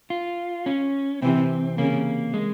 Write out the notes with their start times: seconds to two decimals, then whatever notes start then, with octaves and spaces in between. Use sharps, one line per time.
0.10 F4
0.66 C#4
1.22 C3 E3 C4
1.78 C#3 A#3
2.34 G#3